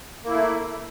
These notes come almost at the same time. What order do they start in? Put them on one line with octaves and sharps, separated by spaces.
A#3 E4 A3